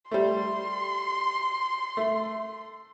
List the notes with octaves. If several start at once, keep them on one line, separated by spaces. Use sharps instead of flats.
G3 A3 C6
A3